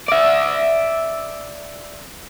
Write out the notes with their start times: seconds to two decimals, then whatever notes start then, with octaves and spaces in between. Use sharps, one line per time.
0.09 D5 E5